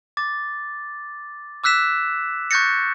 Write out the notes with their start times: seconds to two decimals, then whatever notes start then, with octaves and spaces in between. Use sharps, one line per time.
0.17 D6 A6
1.64 D6 E6 F#6 B6 E7
2.51 C#6 F#6 G6 A6 A#6 C#7